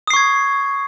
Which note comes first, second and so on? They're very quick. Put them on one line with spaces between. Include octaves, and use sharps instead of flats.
D#6 C7 C#6 G#6